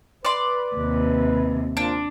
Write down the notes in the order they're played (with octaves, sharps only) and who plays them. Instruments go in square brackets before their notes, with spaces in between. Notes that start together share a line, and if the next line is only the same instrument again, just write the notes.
[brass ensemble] B4 [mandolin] D5 C6
[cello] D#2 C3
[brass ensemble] A#2 F3 [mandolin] D4